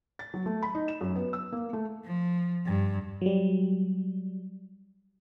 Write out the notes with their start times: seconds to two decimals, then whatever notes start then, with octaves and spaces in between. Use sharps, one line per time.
0.19 A6
0.34 F#3
0.46 A3
0.63 B5
0.75 D#4
0.88 E7
1.01 F#2
1.15 B3
1.33 E6
1.52 A#3
1.73 A3
2.05 F3
2.65 G2
3.21 F#3 G3